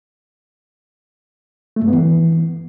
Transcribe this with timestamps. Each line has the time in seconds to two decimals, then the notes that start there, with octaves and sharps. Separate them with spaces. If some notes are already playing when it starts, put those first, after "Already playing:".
1.76 A3
1.82 G2
1.88 B3
1.93 E3